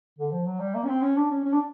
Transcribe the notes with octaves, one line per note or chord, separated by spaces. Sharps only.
D3
F3
F#3
G3
A#3
C#4
C4
C#4
D4
C#4
C#4
D4